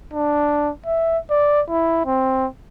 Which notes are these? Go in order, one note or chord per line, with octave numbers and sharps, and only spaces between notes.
D4
E5
D5
E4
C4